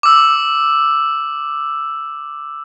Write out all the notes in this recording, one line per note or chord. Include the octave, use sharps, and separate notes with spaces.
D6 E6